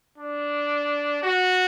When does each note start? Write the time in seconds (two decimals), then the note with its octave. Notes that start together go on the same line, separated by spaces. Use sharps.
0.18 D4
1.23 F#4